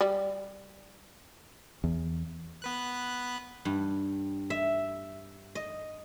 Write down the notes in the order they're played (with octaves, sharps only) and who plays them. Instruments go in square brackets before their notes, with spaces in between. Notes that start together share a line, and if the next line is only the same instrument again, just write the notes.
[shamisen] G3
[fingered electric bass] E2
[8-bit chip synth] B3 B4 F#6
[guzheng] G2
E5
D#5